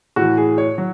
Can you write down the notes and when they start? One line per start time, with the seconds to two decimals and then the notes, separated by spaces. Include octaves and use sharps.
0.16 A2 E3 F#4
0.37 G#4
0.58 C#5
0.78 F#3